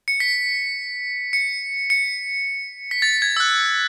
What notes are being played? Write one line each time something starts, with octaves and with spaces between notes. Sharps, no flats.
C#7
B6
C#7
C#7
B6
A6
G#6
E6
F#6